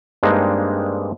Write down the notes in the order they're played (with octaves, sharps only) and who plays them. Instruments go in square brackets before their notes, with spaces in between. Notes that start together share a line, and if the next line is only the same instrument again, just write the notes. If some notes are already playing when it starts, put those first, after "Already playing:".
[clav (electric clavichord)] G2 G#3 A#3 C4 D4 D#4